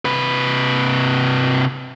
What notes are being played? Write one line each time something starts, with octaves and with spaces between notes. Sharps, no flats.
C3 B4